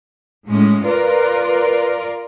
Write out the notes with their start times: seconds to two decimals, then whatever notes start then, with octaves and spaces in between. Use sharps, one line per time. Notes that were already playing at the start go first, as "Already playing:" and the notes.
0.47 A2 G#3 C#4
0.84 F4 A#4 B4 D5